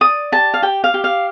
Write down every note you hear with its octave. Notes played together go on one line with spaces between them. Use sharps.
D5 D#6
G4 A5
F5
G4 G5
F5
G4
F5